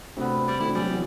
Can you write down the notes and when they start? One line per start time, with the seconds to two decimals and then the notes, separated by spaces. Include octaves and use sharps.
0.17 D2 C3 B3
0.48 G3
0.60 D2 D3 E4
0.75 F#3 G3 G#4
0.90 E2